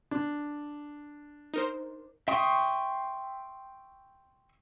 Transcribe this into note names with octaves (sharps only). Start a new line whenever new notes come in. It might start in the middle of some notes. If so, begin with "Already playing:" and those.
D4
D#4 A#4 C5
E5 G5 C6 C#6 D#6